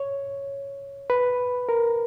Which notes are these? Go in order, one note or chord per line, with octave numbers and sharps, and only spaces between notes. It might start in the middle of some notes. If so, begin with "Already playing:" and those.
Already playing: C#5
B4
A#4